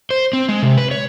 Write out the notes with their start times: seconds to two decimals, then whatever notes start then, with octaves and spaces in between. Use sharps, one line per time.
0.10 C5
0.33 C4
0.48 G#3
0.62 C3
0.78 B4
0.91 C#5